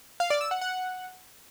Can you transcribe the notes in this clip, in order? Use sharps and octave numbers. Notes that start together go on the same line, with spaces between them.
F5
D5
E6
F#5
F#5